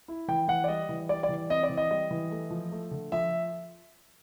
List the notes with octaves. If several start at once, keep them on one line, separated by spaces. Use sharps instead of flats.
E4
E3 G5
E3 F#5
D5
G3 D#5
E3
G3 D5
D5
E3
C4 D#5
D5
E3
D#5
G3 D#5
E3
A3
F3
A3
D3
F3 E5